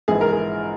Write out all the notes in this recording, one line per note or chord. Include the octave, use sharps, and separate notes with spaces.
A#1 G#2 E3 G#4
A#4
G#4